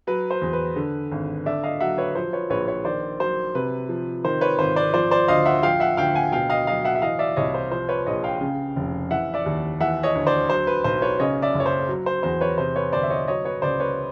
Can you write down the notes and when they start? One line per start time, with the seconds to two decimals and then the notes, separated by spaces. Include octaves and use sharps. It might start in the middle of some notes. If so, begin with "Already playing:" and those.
0.07 F#3 B4
0.31 C5
0.42 E2
0.53 B4
0.76 D3
1.12 G#1
1.46 D3 D5 E5
1.64 D#5 F5
1.80 F#3 E5 F#5
1.98 B4 C#5
2.15 F3 C5
2.33 B4 C#5
2.50 A#1 B4 C#5
2.68 B4 C#5
2.85 D#3 C5 D5
3.20 F#3 C5
3.55 C3 B4
3.89 F3
4.24 D#3 C5
4.41 B4 C#5
4.59 G#1 C5
4.76 C5 D5
4.94 F3 C5 D5
5.11 C5 D5
5.28 D2 D#5 F5
5.46 E5 F#5
5.63 F3 F5 G5
5.80 E5 F#5
5.97 D2 F5 G5
6.15 F#5 G#5
6.32 B2 F5 G5
6.50 D#5 F5
6.67 F#3 D#5 F5
6.85 E5 F#5
6.95 E5
7.02 E3 D#5 F5
7.19 D5 E5
7.36 C2 C#5 D#5
7.54 C5
7.71 F3 C5
7.89 B4 C#5
8.07 A#1 C#5 D#5
8.24 F5 G5
8.41 C#3
8.76 F1
9.10 E3 E5 F#5
9.34 D5 E5
9.46 D#2
9.80 E3 E5 F#5
10.03 C#5 D#5
10.15 D2
10.27 C5 D5
10.50 F#3 C5
10.67 B4
10.84 B1 C5
11.02 B4 C#5
11.19 C#3 C#5 D#5
11.42 D5 E5
11.54 F#1
11.60 C#5
11.66 C5
11.89 F#3
12.06 C5
12.23 E2 C5
12.41 B4 C#5
12.58 C3 C5
12.76 B4 C#5
12.93 G1 C5 D5
13.03 E5
13.10 C#5 D#5
13.28 F#3 C#5 D#5
13.45 B4 C#5
13.62 C#2 C5 D5
13.80 B4 C#5